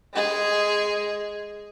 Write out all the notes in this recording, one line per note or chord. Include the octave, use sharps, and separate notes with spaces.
G#3 G#4